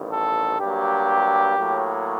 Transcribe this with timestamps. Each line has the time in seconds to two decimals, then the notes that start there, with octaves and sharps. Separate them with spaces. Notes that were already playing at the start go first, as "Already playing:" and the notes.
Already playing: A1 G2 D#3
0.10 A4
0.59 G2 F#3 A#3 G4
1.58 A2 F#3 A#3